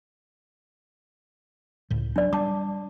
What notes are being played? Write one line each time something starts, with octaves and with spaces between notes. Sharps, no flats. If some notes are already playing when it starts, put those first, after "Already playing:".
C#2 A2
F#3 D4 D5
G3 A5 D6